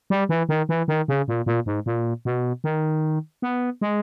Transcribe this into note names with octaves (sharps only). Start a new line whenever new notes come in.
G3
E3
D#3
E3
D#3
C#3
A#2
A#2
G#2
A#2
B2
D#3
B3
G#3